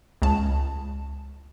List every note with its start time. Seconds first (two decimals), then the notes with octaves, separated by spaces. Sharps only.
0.22 C#2 A5